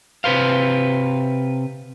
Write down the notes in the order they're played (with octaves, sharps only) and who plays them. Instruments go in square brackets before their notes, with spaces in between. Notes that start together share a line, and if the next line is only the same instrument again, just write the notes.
[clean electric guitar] C3 B4 C5 F5